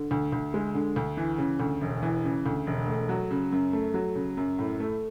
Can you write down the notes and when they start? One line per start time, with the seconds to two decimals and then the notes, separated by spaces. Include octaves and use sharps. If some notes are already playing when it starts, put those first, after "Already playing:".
Already playing: D3
0.11 D2
0.32 D2
0.54 G#3
0.75 D3
0.96 D2
1.17 E3
1.38 C#3
1.60 D2
1.82 E1
2.02 E3
2.24 C#3
2.46 D2
2.67 E1
2.88 A3
3.09 F#3
3.31 C#3
3.52 F#2
3.73 A3
3.94 F#3
4.15 C#3
4.37 F#2
4.59 A2
4.80 A3